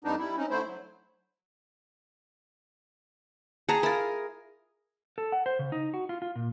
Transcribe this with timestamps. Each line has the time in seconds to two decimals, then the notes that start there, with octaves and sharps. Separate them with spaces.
0.04 F2 G3 B3 D4 D#4
0.19 G3 E4
0.37 C4 C#4 D#4
0.50 D3 A3 E4 C5
0.66 F#3
3.69 G#4 F#5 A5 A#5
3.83 E4 F4 A#4
5.18 A4
5.32 F#5
5.46 C5
5.59 C#3
5.72 D#4
5.94 F#4
6.09 F4
6.22 F4
6.36 A#2